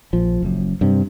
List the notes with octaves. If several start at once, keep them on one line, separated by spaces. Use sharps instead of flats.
A#1 F3
F#1 F#2
G2 C3